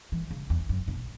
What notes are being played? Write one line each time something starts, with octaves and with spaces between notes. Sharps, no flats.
E3
C#3
E2
F#2
B2